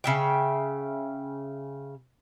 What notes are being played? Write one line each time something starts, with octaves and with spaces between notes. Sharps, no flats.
C#3 E5 G5